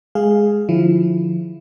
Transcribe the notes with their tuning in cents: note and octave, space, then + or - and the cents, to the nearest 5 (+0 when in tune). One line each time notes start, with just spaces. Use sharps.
G#3 +0 G#4 +0 F5 +0
D3 +30 F3 +10 E4 +10